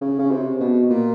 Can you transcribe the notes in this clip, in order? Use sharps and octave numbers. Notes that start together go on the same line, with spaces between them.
C#3
C#3
C3
B2
A#2